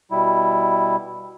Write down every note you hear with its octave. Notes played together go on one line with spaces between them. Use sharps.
B2 G3 E4